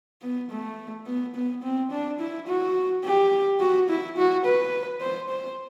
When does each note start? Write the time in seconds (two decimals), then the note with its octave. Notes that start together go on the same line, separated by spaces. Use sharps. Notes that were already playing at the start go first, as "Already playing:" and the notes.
0.22 B3
0.51 A3
1.06 B3
1.35 B3
1.63 C4
1.91 D4
2.20 E4
2.47 F#4
3.05 G4
3.60 F#4
3.89 E4
4.17 F#4
4.46 B4
5.01 C5
5.30 C5